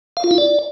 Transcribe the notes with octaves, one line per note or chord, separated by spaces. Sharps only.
F5
F4
E4
D5